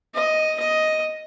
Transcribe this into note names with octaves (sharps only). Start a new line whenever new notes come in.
D#5
D#5